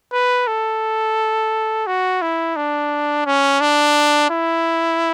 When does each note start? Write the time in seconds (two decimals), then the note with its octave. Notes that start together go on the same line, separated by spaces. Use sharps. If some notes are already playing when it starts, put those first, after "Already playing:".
0.13 B4
0.47 A4
1.87 F#4
2.22 E4
2.56 D4
3.26 C#4
3.60 D4
4.30 E4